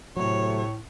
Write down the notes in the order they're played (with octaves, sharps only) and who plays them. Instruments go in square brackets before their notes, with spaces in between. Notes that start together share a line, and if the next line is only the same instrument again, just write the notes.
[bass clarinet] A2 [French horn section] C3 A3 [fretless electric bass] F#3 [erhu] C#5